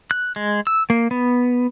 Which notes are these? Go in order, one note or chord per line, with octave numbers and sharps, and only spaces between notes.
F#6
G#3
E6
A#3
B3